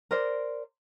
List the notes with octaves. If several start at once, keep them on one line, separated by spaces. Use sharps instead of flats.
A#4 C5 D5